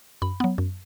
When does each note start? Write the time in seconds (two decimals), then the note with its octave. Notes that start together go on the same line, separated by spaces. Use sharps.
0.22 F#2 B5
0.40 F#3 B3
0.58 F#2